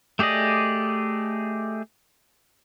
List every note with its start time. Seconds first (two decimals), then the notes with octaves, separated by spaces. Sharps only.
0.19 A3 G4 G#4 D5 D#5